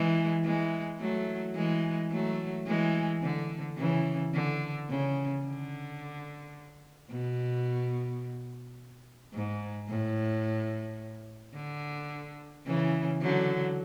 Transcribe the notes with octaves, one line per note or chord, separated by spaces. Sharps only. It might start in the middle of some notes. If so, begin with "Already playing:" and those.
Already playing: E3 G#3
E3 G#3
F#3 A3
E3 G#3
F#3 A3
E3 G#3
D3
C#3 E3
D3
C#3
D3
B2
G#2
A2
D3
C#3 E3
D3 F#3